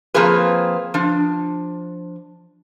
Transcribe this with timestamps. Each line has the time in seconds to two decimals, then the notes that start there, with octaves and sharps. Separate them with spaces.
0.14 F3 A#3 C4 F4 G#4 B4
0.94 F3 D4